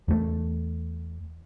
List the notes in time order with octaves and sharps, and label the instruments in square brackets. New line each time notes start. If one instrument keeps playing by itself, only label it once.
[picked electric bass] E2 A3